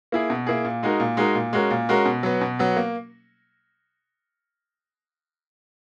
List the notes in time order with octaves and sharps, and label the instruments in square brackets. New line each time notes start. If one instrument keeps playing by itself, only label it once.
[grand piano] A#3 E4 G#4
B2
A#3 E4 G#4
A#2
G#3 D#4 F#4 A#4
A#2
G#3 D#4 F#4 A#4
A#2
G#3 C#4 F#4 A#4
A#2
G#3 C#4 F#4 A#4
B2
F#3 B3
B2
F#3 B3
A#3